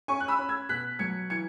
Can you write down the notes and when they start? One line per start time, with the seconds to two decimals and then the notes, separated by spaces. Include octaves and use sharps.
0.08 C#4 G#5 C#6
0.20 F#6
0.28 B5 E6
0.39 C#4
0.49 E6 G#6
0.69 B2 F#6 B6
0.99 F#3 G#6 C#7
1.30 E3 G#6 C#7